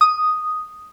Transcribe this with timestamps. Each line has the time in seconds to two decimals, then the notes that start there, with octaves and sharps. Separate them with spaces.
0.01 D#6